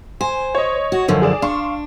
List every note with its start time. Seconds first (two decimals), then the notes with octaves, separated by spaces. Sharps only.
0.21 C5 G#5
0.55 C#5 D#5
0.92 F#4
1.08 F#2 D3 F3
1.22 G#4 D5 E7
1.42 D4 F5 C6 C#6